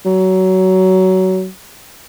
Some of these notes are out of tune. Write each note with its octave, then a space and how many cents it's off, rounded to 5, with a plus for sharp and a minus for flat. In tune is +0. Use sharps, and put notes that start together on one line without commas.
F#3 +20